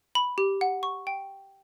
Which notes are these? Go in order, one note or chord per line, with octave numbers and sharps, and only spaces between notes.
B5
G4
F#5
C#6
G5